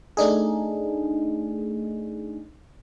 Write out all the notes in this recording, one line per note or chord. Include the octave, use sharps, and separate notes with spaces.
A3 D4 D#4 G#4